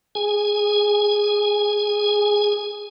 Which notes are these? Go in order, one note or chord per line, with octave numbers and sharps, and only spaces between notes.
G#4 G#5